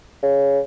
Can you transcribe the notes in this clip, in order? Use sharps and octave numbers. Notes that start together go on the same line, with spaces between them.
C#3